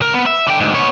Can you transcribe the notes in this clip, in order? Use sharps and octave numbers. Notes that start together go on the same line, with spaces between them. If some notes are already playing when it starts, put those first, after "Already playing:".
C#2 A#4
B3
E5
D3 G5
D2 G#2
B3 C#5